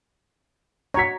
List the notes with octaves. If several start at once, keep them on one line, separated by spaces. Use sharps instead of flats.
F#4 C#5 A#5 B6